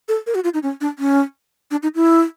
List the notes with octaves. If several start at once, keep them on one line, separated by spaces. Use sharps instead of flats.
A4
A#4
F#4
F4
D#4
C#4
D4
C#4
D4
D#4
E4